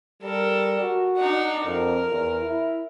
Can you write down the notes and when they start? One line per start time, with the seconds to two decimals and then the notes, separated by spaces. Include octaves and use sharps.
0.23 G3 A4 A#4
0.80 F#4
1.16 D4 D#4 F#5
1.65 F2 A#4
2.10 E2
2.42 E4